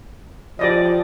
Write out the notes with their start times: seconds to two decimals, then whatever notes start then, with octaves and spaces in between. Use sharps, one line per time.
0.59 F3 G4 D5 D#5